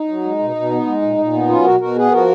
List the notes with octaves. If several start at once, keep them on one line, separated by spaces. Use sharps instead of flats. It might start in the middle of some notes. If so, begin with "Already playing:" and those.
Already playing: D#4
F#3
G#3
B2
B2
B3
G#3
A#2
A#2
B3
F#3 C#4 F4
B2 F#4 A#4
B2 F#4 A#4
B3 G#4 B4
F3 F#4 A#4